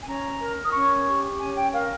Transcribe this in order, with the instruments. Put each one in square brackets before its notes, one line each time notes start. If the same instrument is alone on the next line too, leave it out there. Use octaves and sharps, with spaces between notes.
[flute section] G#5
C#4 A#5
A#4
D#6
C#4 C#6
G4
C#4 G#5
G5
A#4 F5